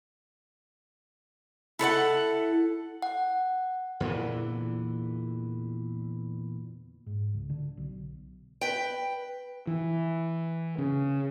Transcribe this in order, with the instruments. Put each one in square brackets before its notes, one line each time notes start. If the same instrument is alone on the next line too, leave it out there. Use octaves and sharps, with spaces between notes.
[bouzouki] E4 A4 B4 F#5
[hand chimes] F#5
[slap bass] E2 A#2 D3 E3
[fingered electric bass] G#2
C#2
D3
B1
[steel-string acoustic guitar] B4 G5
[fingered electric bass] E3
C#3